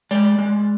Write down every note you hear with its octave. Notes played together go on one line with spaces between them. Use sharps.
G#3 D5
G#3